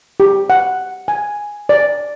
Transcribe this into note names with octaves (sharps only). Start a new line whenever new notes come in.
G4
F#5
G#5
D5